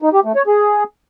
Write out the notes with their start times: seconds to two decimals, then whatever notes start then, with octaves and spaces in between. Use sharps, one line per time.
0.02 D#4
0.13 G4
0.24 A3
0.36 C#5
0.47 G#4